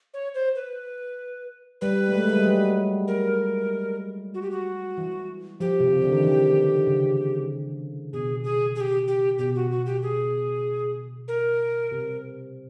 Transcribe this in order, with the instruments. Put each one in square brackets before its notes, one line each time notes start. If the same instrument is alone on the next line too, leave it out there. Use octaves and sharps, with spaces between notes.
[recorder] C#5
C5
B4
[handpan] G3 [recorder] B4
[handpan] A3
G#3
G#3
G3
F#3
[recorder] A#4
F#4
G4
F#4
[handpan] E3
[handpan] F3 [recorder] G4
[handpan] C3
C#3
D3
D#3
E3
C#3
[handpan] B2 [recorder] G#4
[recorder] G#4
G#4
G4
G4
[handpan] B2 [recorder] G4
[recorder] F#4
F#4
G4
G#4
A#4
[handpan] C3